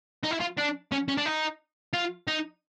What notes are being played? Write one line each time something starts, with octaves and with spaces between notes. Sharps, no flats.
D#4
E4
F4
D4
C#4
C#4
D4
D#4
F4
D#4